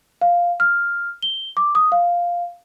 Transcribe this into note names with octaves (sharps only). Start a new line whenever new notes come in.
F5
F6
G7
D6
D#6
F5